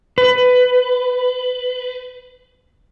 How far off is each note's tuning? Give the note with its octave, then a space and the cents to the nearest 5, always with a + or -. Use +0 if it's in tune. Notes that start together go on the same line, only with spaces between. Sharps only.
B4 +20